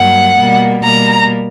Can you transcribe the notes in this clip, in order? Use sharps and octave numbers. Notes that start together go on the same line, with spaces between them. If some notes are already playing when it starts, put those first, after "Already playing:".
Already playing: G2 F#3 A#3 F#5
B2 G3 A#3
B2 G3 A#3 A#5